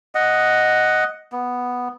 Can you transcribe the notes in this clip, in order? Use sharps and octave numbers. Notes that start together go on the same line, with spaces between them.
D#5 F#5
B3